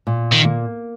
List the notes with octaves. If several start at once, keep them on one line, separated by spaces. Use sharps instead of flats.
A#2
D#3
A#3